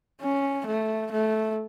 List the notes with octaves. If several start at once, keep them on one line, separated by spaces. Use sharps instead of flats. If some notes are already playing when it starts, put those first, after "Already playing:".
C#4
A3
A3